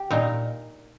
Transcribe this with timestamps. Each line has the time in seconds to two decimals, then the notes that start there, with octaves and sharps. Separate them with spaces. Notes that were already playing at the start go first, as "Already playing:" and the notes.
Already playing: G4
0.11 A#2 D#4